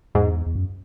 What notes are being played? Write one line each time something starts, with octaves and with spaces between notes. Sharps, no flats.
E2 G#2
E2
F#2